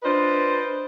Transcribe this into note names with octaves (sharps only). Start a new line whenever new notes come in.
D4 F4 B4 C5 D#5